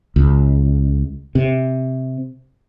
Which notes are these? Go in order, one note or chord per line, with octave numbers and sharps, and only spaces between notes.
C#2
C3